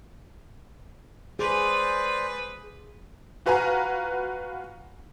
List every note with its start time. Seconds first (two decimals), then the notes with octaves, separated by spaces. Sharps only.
1.39 G#4 B4 C5 D5
3.46 F4 F#4 B4 F5 G#5 A#5